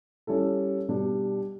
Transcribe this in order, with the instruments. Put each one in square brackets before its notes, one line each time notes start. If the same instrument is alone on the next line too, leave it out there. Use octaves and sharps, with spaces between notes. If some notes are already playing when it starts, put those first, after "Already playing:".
[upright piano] G3 C#4 E4 A4
B2 G3 D4